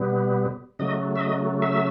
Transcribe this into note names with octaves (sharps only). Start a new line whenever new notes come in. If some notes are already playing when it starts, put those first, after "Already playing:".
Already playing: B2 G3 B3
C#3 F#3 A3 D#5
E5
D#5
E5